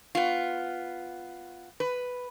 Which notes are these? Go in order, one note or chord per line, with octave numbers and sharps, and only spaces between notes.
B3 F4
B4